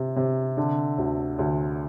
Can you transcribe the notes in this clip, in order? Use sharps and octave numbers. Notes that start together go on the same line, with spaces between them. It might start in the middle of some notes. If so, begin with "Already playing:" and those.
Already playing: C3
C3
D3
D2
D2